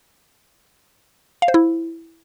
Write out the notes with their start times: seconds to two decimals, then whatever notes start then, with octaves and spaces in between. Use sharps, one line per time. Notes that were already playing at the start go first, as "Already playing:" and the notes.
1.42 F5
1.48 C5
1.54 E4